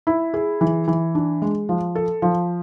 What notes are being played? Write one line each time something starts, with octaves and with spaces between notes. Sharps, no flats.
E4
G#4
E3
E3
D4
G#3
F3
A4
F3